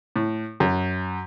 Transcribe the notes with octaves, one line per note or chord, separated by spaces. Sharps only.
A2
F#2